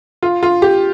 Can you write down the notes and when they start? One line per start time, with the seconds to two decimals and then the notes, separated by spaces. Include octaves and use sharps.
0.23 F4
0.43 F4
0.62 G4